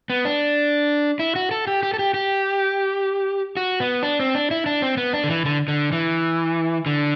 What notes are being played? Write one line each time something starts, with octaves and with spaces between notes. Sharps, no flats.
B3
D4
E4
F#4
A4
G4
G4
A4
G4
G4
F#4
B3
D4
C4
D4
E4
D4
C4
B3
D4
D3
E3
D3
D3
E3
D3